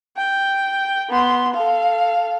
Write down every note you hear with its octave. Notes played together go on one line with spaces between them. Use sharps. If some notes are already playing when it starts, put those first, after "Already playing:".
G5
B3 C6
A4 F5